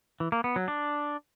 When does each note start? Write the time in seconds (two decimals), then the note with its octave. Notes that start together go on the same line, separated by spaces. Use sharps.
0.20 E3
0.32 A#3
0.44 B3
0.56 F#3
0.68 D4